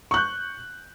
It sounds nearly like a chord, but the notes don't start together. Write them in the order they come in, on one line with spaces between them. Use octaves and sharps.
C#6 F#6 G6